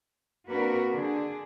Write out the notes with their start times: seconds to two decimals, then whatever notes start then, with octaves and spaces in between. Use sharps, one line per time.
0.48 A#3 C4 D4 F#4 A#4 B4
0.92 D3 D4 G#4